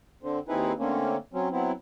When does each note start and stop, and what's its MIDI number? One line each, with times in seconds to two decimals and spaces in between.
0.23 0.39 50
0.23 0.39 60
0.48 0.73 39
0.48 0.73 60
0.48 0.73 63
0.48 0.73 64
0.48 0.73 68
0.48 0.73 71
0.79 1.16 50
0.79 1.16 57
0.79 1.16 58
0.79 1.16 60
0.79 1.16 61
1.34 1.48 54
1.34 1.48 60
1.34 1.48 61
1.52 1.72 54
1.52 1.72 59
1.52 1.72 60
1.52 1.72 64